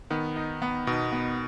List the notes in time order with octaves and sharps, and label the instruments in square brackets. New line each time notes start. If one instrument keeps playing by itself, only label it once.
[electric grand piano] D#3 [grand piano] B3
[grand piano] D#4
B3
[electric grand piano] B2 [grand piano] D#4
[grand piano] B3